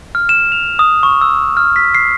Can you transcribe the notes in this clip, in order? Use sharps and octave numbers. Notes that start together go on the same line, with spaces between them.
F6
E7
F7
D#6
C#6
E6
F6
B6
C7